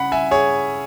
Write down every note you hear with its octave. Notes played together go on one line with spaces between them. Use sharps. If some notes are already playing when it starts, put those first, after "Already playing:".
Already playing: C#3 F#5 B5
E5 G#5
G#4 C#5